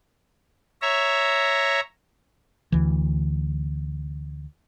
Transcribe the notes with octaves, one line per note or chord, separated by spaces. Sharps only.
C#5 E5 A#5
D2 E3